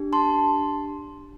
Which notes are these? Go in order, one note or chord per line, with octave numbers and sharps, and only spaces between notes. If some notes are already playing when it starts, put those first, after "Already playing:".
Already playing: D4 G4
A5 C6